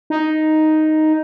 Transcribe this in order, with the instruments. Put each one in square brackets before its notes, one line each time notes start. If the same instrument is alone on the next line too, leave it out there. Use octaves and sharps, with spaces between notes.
[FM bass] D#4